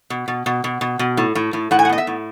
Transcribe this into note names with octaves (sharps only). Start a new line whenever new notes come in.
B2
B2
B2
B2
B2
B2
A2
A2
A2
A2 F#5
G#5
F#5
B3 D#5
E5
A2